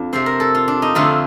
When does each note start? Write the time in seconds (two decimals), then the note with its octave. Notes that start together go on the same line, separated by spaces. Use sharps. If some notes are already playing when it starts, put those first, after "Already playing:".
Already playing: F2 D4
0.13 C3 F3 C4 C5
0.26 A#4
0.40 A4
0.55 F4
0.68 D4
0.82 D#4
0.95 F2 D3 A3 C4 F4